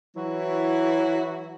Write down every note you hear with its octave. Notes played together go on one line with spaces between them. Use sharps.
E3 F#3 E4 F#4